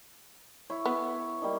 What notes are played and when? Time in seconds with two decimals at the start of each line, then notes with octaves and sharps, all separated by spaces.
0.70 E4 C#5
0.86 B3
1.42 G3 A#3 D#4